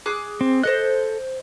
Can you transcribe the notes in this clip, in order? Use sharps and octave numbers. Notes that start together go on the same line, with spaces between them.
G#4 D6 F#6
C4
A4 C5 D#5 F#6